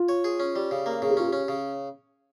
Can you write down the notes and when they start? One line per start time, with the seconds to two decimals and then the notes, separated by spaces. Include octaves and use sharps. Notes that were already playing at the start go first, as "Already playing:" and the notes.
Already playing: F4
0.09 C#5
0.24 G#4
0.40 C#4
0.56 G3
0.71 C#3
0.86 A#3
1.02 C#3 G#4
1.10 G4
1.17 C#4 F4
1.28 C#4 G4
1.48 C#3